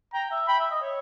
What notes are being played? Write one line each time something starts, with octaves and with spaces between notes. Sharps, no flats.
G5 A#5
E5
G5 B5
E5
D#5
C#5